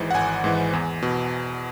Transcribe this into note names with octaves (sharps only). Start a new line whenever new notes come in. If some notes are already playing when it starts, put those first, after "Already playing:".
Already playing: G#1 G#2 E3
F#5
G#1 G#5
G#2 E3
E2
B2